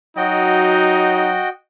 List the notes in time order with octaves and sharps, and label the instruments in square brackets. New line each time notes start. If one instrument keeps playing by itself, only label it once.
[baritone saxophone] F#3 [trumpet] D#4 [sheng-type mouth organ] F#4 D#5 G5